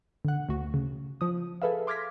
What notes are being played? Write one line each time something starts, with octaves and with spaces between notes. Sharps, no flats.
D3 F#5
D2 F#4
C#3
F3 D#6
G#4 A4 B4 E5 F5
C6 D6 F6 G#6 A#6 B6